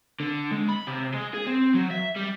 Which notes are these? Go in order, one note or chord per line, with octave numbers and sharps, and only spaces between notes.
D3
G#3
B5
C3
G#3
G#4
C4
F#3
E5
G3